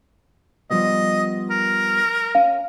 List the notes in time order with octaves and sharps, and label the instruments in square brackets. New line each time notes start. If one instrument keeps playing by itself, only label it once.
[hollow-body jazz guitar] F3 G3 B3 [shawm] D#5
[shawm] A#4
[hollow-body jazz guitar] C#4 [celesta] F5